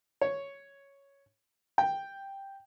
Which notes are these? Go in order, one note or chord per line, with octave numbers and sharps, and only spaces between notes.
C#5
G5